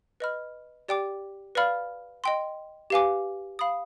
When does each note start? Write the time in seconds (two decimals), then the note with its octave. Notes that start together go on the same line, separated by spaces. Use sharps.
0.20 B4 D#5 B5 F6
0.88 G4 D5 G5 D6
1.55 B4 D5 F5 B5 F6
2.24 D#5 G5 C6
2.90 G4 B4 F5 G#5 D6
3.59 F5 B5 D#6